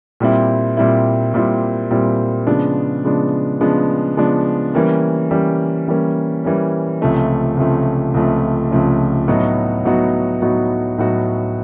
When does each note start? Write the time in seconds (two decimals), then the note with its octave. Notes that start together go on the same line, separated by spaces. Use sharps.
0.20 A#2 G3 C4 E4
0.77 A#2 G3 C4 E4
1.34 A#2 G3 C4 E4
1.91 A#2 G3 C4 E4
2.47 C#3 F3 G#3 B3 D4
3.04 C#3 F3 G#3 B3 D4
3.61 C#3 F3 G#3 B3 D4
4.17 C#3 F3 G#3 B3 D4
4.74 E3 G3 A#3 C#4
5.31 E3 G3 A#3 C#4
5.88 E3 G3 A#3 C#4
6.44 E3 G3 A#3 C#4
7.01 C#2 C3 F3 A3 C#4
7.57 C#2 C3 F3 A3 C#4
8.14 C#2 C3 F3 A3 C#4
8.71 C#2 C3 F3 A3 C#4
9.28 A2 F#3 B3 D#4 F#4
9.85 A2 F#3 B3 D#4 F#4
10.42 A2 F#3 B3 D#4 F#4
10.98 A2 F#3 B3 D#4 F#4